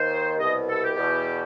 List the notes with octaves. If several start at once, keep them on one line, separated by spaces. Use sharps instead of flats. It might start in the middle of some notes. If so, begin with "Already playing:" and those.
Already playing: D#2 D#3 C5
C2 D#5
B2
A4
G4
E2 B2